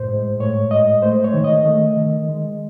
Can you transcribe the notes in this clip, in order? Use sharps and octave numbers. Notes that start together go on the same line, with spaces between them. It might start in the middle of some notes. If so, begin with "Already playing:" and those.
Already playing: A2 C5
G#3
A2 C#5
G#3 D#5
A3 C5
C#5
D#3
D#5
A3
D#3
G#3